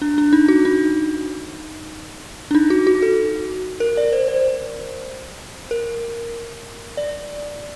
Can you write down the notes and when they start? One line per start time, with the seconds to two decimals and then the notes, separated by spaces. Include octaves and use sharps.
0.02 D4
0.18 D4
0.33 D#4
0.48 F#4
0.65 D#4
2.51 D4
2.55 D#4
2.70 F#4
2.87 F#4
3.02 A4
3.80 A#4
3.97 D5
4.13 C5
4.28 C5
5.71 A#4
6.97 D5